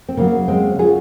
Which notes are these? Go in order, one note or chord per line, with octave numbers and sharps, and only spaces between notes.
C4
C#3 F#3 A#3
G#3 C4
C#3 F#3 F4 G#4